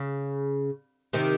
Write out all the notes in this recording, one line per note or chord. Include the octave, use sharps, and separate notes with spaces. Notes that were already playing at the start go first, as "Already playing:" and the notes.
Already playing: C#3
C3 D#3